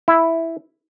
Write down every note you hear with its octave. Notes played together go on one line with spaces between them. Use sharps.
E4